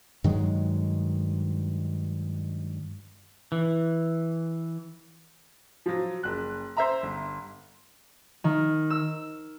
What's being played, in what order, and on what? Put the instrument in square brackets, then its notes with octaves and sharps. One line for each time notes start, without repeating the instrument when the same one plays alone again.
[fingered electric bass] G2 D#3 F#3 G#3
[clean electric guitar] E3
[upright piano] F3 F#3
F#1 F#6
C5 E5 A#5
G1
[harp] D#3
E6